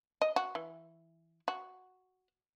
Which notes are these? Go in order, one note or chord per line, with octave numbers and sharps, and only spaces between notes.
D#5
F#4
E3
F#4